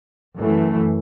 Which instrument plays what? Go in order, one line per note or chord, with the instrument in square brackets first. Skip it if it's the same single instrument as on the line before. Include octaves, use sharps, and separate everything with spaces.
[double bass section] F#2 E3 A3